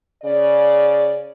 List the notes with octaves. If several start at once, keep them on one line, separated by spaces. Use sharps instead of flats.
C#3 D5